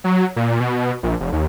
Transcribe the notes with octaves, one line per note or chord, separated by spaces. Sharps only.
F#3
A#2
B2
A#1
F1
D#2